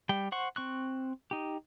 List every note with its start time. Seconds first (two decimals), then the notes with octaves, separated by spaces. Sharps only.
0.09 G3 G5
0.32 C5 F#5 C#6
0.56 C4 C#6 F#6
1.31 D#4 G4